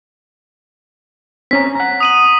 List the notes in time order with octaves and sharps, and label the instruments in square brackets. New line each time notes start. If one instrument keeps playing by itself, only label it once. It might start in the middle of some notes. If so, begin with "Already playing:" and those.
[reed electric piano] C4 C#4 A#5 [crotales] B6
[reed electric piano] F#5 A#5
[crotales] D#6 D#7 F#7